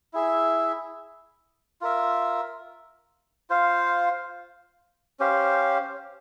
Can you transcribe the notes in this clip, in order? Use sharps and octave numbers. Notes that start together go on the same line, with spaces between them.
E4 G#4 E5
F4 A#4 E5
F4 C5 F5
C#4 G4 C5 F5